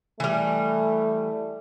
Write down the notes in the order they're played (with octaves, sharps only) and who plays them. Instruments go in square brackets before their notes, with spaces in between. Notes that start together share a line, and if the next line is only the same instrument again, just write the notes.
[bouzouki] E3 G3 [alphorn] A3